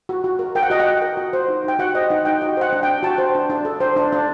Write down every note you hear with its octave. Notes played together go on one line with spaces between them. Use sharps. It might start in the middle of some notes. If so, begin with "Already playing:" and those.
F#4
F#4
A#4
A#4 G5
F#5
F#4 D#5
F#5
F#4
A#4
F#4
C5
D#4
D#4 G5
F#4 F#5
C5 D#5
D#4 F#5
D#4 G5
F#4 D#5
C5 F#5
D4
G5
D4
F#4 A5
C5
D4
D4
A4
C5
D4
D4